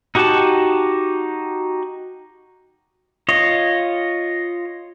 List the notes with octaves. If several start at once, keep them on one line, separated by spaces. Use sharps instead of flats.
D#4 F#4 G4 F#5 A5
F4 C#5 D#5